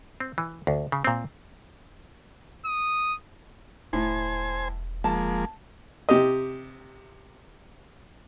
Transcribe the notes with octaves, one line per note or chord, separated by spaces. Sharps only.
C4
E3
D2
C#3
A#2 C4
D#6
E1 A2 C5 G#5
F3 G#3 A#3 A5
C3 G4 D#5